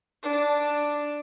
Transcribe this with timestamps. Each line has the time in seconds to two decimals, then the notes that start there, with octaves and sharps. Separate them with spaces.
0.23 D4